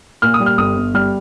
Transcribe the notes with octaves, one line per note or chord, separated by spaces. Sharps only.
A#2 F6
D#6
G3
F6
G1 D#6
G1
G3 F6